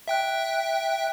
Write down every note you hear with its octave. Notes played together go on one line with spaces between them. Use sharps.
E5 G5 F#6